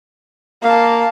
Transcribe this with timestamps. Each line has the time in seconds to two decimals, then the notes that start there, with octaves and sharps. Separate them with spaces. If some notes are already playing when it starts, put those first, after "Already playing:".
0.63 A#3 F5 A5